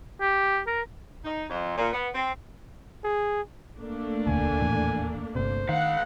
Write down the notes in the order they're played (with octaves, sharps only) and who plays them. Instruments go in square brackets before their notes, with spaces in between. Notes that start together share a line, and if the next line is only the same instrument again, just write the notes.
[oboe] G4
A#4
[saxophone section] D#4
F2
A#2
B3
C4
[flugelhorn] G#4
[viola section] A3 A#3 D4
[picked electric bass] E1 D2 [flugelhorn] G#5
[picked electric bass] D#1 E2 A2
[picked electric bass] G1 C3 [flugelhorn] C5
[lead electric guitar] C#2 F5 [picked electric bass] D#3 [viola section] F#5